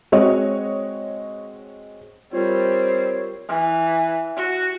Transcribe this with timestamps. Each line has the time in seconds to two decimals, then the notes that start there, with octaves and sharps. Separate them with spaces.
0.12 G#3 C4 F#4 C#5 D#5
2.33 G3 C4 F4 A#4 C#5
3.49 E3
4.36 F#4